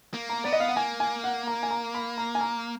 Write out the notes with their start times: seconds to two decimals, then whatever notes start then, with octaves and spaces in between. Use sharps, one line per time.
0.14 A#3
0.30 A#5
0.44 B3 D5
0.52 D#5
0.60 F5
0.68 F#5
0.76 A#3 G#5
1.00 G#5
1.24 F#5
1.47 A#5
1.63 G#5
1.71 A#5
1.95 B5
2.18 A#5
2.35 G#5
2.41 A#5